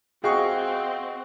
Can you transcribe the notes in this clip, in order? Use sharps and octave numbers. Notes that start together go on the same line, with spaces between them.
C4 F#4 G#4 D#5 F5 G5 C#6